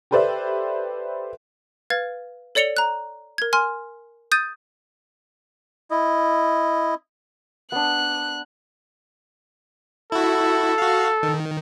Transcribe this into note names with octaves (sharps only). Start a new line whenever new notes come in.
G4 A4 B4 C5 D5 E5
B4 F5 F6 G#6 A6
A4 C#5 D5 C#7 F7 G7
A#5 F#6
A#4 G#6
G#5 C6 F6
D#6 G6 A6 D#7
E4 D#5
B3 D4 F#6
E4 F#4 A4
F#4 F5
D#3